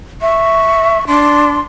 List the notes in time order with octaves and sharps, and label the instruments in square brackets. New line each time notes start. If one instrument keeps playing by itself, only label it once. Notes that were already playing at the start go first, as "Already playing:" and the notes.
[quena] E5 [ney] C#6
[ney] D4 [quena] C6